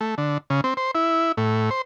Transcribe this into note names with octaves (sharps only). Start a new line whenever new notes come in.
A3
D3
C#3
C4
C5
E4
A2
C5